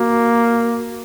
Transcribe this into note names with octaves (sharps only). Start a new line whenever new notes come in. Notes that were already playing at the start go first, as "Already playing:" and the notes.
Already playing: A#3 F#4